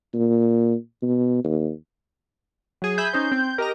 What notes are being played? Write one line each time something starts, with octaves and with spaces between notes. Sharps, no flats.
A#2
B2
D#2
F#3 G#4
G#4 E5 B5 G6
C#4 D#4 C5
C4
G4 A#4 D#5 A#5